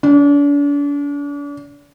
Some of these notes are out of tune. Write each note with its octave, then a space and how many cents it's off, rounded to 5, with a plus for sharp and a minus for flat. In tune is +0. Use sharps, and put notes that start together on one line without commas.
D4 -40